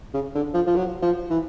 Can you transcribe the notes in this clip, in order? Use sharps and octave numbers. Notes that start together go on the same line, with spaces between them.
C#3
D3
F3
F3
F#3
F3
E3